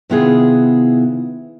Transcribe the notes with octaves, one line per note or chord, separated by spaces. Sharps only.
C3 D#3 B3 E4 F4 G#4